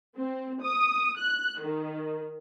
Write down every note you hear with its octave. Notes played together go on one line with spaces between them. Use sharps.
C4
D#6
F#6
D#3